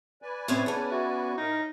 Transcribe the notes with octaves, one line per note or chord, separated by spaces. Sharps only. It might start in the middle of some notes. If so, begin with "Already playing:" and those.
B4 D5 G#5
A2 C4 C#4
B3 C#4 G#4 C#5 A5
F#4 E5
A2 D#4 A#4